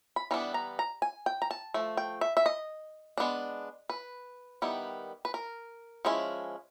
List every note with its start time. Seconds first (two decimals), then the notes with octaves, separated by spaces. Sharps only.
0.16 B5
0.31 E3 G3 B3 D4 A#5
0.54 A#5
0.79 A#5
1.02 G#5
1.26 G5
1.42 A#5
1.51 A5
1.74 F3 A3
1.97 G5
2.21 E5
2.37 E5
2.46 D#5
3.18 G#3 B3 D4
3.90 B4
4.62 D#3 G3 B3 E4
5.25 B4
5.34 A#4
6.05 F3 G#3 C#4 E4